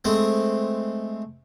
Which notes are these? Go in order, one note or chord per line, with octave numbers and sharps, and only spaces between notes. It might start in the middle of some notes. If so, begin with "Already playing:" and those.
G#3 A3 C4